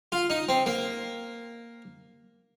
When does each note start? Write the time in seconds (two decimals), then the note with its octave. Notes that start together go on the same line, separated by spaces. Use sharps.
0.12 F4
0.30 D#4
0.49 C4
0.66 A#3